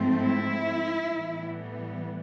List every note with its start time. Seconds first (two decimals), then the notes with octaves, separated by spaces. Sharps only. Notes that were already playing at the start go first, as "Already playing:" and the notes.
Already playing: G#2 F3 A3 C4
0.20 E4
1.07 A2 E3 G3 B3